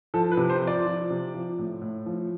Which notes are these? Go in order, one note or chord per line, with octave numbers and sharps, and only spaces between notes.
F3 A4
B4
C3
C5
F3
D5
F3
C3
F3
A2
A2
F3